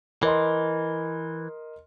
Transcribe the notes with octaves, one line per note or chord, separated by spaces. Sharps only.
E3 A#4 D#5 C6